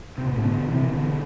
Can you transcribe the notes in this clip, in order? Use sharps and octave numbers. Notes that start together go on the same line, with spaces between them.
C3
B2
A2 C3
B2 D3
C3 E3
C3
B2 D3